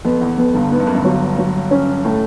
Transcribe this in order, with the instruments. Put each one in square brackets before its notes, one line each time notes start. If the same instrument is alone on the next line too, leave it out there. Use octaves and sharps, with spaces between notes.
[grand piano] F2 [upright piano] B3
[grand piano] E2
[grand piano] F2 [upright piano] B3
[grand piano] G1 G2
[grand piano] G#2 [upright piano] B3
[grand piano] G2
F#2
G1 G2
[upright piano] F#3
F#3
C#4
[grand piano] A2 [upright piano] A3